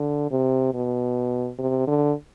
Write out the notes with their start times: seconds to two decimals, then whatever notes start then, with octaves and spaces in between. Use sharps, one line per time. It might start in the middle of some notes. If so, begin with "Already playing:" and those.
Already playing: D3
0.31 C3
0.74 B2
1.59 C3
1.87 D3